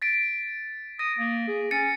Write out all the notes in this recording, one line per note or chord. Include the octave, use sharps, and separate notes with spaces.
A6 B6 D7
D#6 A#6
A#3
G#4
C#4 A6 C#7 D#7